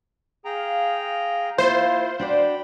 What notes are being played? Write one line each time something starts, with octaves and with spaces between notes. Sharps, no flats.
G#4 F5 G5 A#5
A#3 E4 F4 C5
D4 F#4 D5 G5 B5